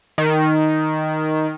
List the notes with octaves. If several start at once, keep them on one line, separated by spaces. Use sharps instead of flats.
D#3